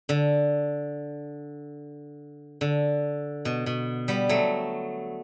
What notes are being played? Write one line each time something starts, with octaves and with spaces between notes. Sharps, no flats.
D3
D3
B2
B2
G3 B3
F#3 A3